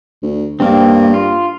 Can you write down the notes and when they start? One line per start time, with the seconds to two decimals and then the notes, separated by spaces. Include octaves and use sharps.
0.23 D2
0.60 G2 A#3 C4
1.14 F4